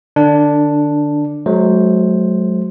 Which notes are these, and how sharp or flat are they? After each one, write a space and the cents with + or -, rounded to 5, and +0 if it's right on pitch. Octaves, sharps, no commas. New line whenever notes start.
D3 +30 D4 +0
F#3 +0 A3 -45 C5 +0